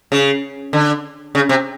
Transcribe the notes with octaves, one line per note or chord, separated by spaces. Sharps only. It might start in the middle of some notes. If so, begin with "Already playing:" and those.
C#3
D3
C#3
C3